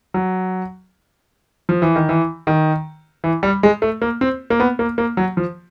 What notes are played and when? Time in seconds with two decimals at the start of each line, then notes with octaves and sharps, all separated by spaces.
0.14 F#3
1.69 F3
1.82 E3
1.96 D#3
2.09 E3
2.47 D#3
3.24 E3
3.43 G3
3.63 G#3
3.82 A3
4.02 A#3
4.21 C4
4.50 A#3
4.60 B3
4.79 A#3
4.98 A#3
5.17 F#3
5.37 F3